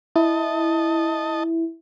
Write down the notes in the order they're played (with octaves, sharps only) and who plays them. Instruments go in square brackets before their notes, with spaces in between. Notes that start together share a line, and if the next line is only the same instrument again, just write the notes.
[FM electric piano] E4 [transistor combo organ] D#5 A5